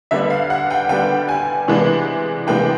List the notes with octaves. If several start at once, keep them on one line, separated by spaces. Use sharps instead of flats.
D3 G3 B3 D4 E5
F5
F#5
G5
D3 G3 B3 D4 G5
G#5
C3 E3 G#3 B3 D4
C3 E3 G#3 B3 D4 G5